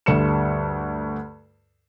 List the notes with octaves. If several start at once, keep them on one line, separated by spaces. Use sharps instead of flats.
D2 G2 A4 C#7 E7